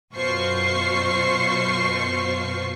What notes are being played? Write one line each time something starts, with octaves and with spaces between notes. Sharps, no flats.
F#2 B2 F4 C5 C#6 C7